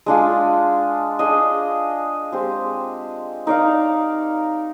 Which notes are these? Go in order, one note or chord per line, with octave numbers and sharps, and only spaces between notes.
G#3 D4 F4 G#4
D4 G#4 D#5
G#3 C4 G4 C5
D#4 A#4 D5 F5